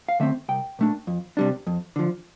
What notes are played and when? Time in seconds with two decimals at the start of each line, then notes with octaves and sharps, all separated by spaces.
0.09 F5
0.20 D3 A3 C4 E5
0.49 C2 G5
0.79 A#2 A3 D4
1.07 F2
1.37 C3 G3 D4
1.67 F2
1.96 D3 F3